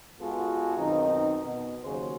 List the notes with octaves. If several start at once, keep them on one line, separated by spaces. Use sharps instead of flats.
G#3 B3 F4 F#4 G#4 A4
F#2 B2 D#3 C4 D#4
B2
D#2 C#3 F#3 F#4 G#4 C5